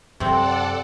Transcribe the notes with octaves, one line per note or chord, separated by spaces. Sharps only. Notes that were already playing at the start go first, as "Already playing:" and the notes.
F#2 C3 C4 A4 D5 F#5